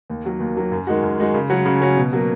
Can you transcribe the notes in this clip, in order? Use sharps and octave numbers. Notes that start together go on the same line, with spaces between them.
D#2
D#3 F#3 A#3
D#2
D#3 F#3 A#3
F#2
D#3 G#3 D#4 F#4
F#2
D#3 G#3 D#4 F#4
C#3
F#3 C#4 F#4
C#3
F#3 C#4 F#4
B2
F#3 A#3